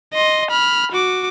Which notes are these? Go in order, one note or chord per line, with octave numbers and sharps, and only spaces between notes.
D#5 C6
B5 F6
F#4 D6